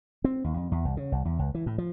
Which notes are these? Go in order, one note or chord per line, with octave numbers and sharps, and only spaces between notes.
C4
D#2
F2
E2
C2
C#3
C2
E2
C#2
E3
A2
F3